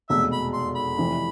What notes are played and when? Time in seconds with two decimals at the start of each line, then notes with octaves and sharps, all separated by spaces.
0.09 F1 E2 B2 G#3 E5
0.32 B5
0.53 C6
0.75 B5
0.98 F1 F2 C3 E3